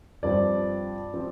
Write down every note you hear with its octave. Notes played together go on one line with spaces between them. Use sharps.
G2 F3 C4 D5
F3 C4